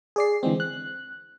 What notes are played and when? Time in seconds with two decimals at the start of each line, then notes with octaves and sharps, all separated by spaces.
0.16 G#4 D5 C7
0.43 D3 E3 G#3 C4
0.60 F#6